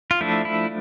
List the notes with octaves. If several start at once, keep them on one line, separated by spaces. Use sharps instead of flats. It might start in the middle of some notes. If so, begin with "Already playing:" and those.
F4
F3 A3 D4 E4
E4